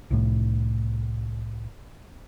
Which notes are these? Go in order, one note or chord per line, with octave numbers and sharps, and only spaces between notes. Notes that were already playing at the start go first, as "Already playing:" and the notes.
C2 A2